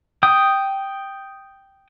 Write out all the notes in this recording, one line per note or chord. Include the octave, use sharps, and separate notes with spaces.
G5 D#6